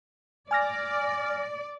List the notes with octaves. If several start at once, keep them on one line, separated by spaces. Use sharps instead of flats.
D5 G#5 F6 A#6